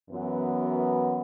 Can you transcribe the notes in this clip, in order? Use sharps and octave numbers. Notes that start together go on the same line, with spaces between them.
F#2 E3 B3 F#4